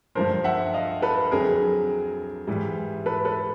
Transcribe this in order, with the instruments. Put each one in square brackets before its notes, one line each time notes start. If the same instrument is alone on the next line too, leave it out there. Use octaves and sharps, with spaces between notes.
[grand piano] G2 D3 F3 A#4 C5
E5 F#5
D#5 F5
A4 B4
F2 D3 F#3 G#4 A#4
G#2 E3 G3
A4 B4
A4 B4